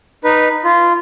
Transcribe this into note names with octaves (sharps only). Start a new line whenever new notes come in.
D#4 B4
F4